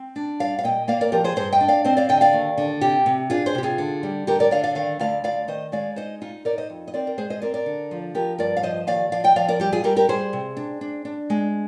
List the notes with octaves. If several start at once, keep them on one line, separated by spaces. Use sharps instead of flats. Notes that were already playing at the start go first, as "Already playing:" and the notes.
Already playing: C4
D4
G3 D5 F5
F5
A#2 D#5 G5
A#3 D5 F5
A#4 D5
F3 G4 A#4
G#4 C5
G2 G#4 C5
D#5 G5
D4
D5 F5
C4 C5 D#5
D5 F5
D3 D#5 G5
D5 F5
D#2
D3
C3 G4
C3
D4 F4 G#4
G#4 C5
C3 G4
F4 G#4
D3
G3
D3 G4 A#4
A#4 D5
D3 D5 F5
D5 F5
D#3 D5 F5
D2 D5 F5
D2 D5 F5
D#3 C5 D#5
G#3 D5 F5
D#4 C5 D#5
D#4 F4
D#4 A#4 D5
C5 D#5
F2
D#5
C4 A#4 D5
A#4
G#3 G#4 C5
C5 D#5
C4 A#4 D5
A#4 D5
D3
F3
F3 G4 A#4
G2 A#4 D5
F5
F3 C5 D#5
D#2 D5 F5
F3 D5 F5
D#5 G5
F3 D5 F5
A#4 D5
G3 G4
F4 G#4
G3 G4 A#4
G4 A#4
G3 G#4 C5
C3
D4
D4
D4
G#3